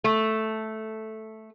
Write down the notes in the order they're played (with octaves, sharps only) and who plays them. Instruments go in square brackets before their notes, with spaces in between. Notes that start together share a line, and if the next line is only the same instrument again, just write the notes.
[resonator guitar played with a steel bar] A3